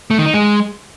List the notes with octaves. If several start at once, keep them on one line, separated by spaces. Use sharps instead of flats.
A3
D#3
D#4
G#3